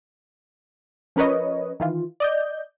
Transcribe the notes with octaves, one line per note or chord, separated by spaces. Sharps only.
F3 C#4 A#4 B4 C#5 D#5
D#3 E3 F4
D5 D#5 G6